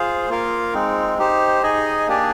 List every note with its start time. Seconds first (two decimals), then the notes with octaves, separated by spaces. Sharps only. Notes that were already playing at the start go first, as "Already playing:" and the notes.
Already playing: F4 G#4 C5 F5
0.29 A#3 F4 A#4 F5
0.74 G#3 C4 D#4
1.19 D#4 G4 C5
1.63 D#4 G#4 D#5 G#5
2.08 A#3 D4 G4 D5 G#5